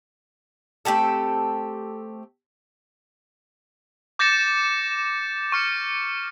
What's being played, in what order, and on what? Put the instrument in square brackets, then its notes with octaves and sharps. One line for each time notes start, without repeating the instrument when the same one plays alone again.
[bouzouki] A3 C4 G4 A4
[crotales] D6 G6 A6 A#6 C#7 E7
C#6 F6 C#7